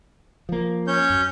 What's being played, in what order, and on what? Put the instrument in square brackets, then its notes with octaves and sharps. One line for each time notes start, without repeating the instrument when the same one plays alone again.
[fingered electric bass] F3 A#3
[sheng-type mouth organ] C#4 C#5 G6
[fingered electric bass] F#2